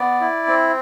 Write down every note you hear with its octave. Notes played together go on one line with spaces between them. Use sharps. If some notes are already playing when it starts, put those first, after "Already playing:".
Already playing: B3 D5
E4
C4